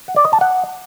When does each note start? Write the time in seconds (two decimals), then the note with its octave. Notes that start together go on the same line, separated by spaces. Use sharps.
0.08 F#5
0.16 D5
0.25 D#5
0.33 A5
0.41 F#5